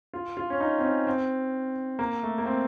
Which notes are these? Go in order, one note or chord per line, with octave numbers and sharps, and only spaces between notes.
F4
F4
C#4
D#4
C4
C#4
C4
A#3
A3
A#3
C4